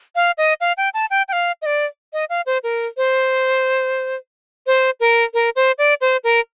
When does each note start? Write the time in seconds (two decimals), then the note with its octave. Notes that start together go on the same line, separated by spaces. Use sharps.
0.16 F5
0.38 D#5
0.61 F5
0.77 G5
0.94 A5
1.11 G5
1.28 G5
1.33 F5
1.62 D#5
1.66 D5
2.13 D#5
2.30 F5
2.46 C5
2.63 A#4
2.97 C5
4.67 C5
5.00 A#4
5.34 A#4
5.56 C5
5.78 D5
6.01 C5
6.24 A#4